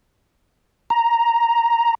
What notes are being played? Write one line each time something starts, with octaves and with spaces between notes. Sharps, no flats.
A#5